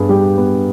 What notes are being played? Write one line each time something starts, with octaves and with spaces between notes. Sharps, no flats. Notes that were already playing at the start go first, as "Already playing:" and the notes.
Already playing: G2 B3 G#4
G3 G4
B3